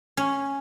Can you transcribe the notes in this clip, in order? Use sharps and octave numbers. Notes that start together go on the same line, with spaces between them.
C#4